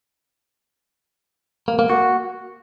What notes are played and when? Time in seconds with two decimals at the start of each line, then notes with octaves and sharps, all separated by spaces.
1.68 A#3
1.79 A#3
1.90 F#4